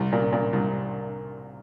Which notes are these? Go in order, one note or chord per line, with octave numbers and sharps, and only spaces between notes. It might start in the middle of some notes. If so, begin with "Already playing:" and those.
Already playing: C2
A#2
A#2
C2